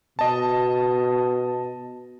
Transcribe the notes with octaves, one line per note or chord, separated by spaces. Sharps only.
B2 D#5 A5